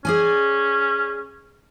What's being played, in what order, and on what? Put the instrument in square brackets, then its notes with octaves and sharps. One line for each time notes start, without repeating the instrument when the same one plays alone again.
[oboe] C#4 [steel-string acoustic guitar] G#4 D5 G#5